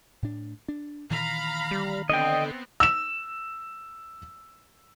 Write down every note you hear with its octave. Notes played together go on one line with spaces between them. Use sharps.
A2 D4
D4
A#2 D#3 E3 F5 A#5 B5
G3
D3 B3 C4 D#5 G5
E6 E7